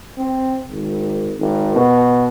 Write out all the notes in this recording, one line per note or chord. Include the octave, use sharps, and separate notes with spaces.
C4
G#1
G#1
B2